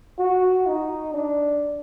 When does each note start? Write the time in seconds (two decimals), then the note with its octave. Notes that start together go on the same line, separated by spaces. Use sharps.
0.19 F#4
0.67 D#4
1.14 D4